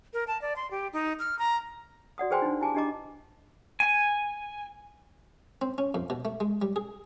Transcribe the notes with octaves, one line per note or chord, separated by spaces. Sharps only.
A#4
A5
D5
C6
G4
D#4
F6
A#5
F#4 D5 F#5 D#6
G#4 B4 C5 G5 G#5 C6
D4 D#4
E4 G4 G#5 A5 D6
D4 E4 G4 D#5 A#5 D6
G#5
C4
C#4
F2
B2
A3
G#3
G3
G#4